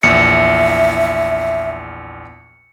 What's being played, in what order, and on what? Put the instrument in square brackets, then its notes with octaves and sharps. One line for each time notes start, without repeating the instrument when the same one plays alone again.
[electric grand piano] A#1 E2 [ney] E5 [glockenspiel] C#7